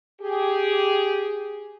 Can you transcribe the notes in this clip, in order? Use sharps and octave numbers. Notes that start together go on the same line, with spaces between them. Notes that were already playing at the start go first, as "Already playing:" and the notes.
G4 G#4